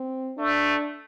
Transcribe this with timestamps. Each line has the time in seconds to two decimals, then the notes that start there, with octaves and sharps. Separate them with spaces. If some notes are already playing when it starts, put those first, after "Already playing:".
Already playing: C4
0.38 A3 D4